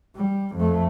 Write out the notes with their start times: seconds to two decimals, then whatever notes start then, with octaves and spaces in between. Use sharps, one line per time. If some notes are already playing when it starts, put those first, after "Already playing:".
0.16 G3
0.56 F2 A3